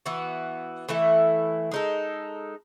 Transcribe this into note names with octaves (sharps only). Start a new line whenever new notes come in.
E3 B3 F#4
E3 A3 E4 A4
G#3 D#4 A4